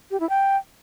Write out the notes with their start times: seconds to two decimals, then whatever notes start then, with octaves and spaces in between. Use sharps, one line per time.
0.11 G4
0.20 E4
0.29 G5